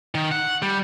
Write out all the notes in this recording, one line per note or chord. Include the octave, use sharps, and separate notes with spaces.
D#3
F#5
G3